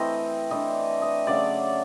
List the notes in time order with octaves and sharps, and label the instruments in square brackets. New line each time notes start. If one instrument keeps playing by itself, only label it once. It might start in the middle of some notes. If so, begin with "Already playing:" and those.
Already playing: [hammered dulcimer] E3 A3 C4 D#5
E3 A3 D4 D#5
D#5
C#3 F#3 A3 D5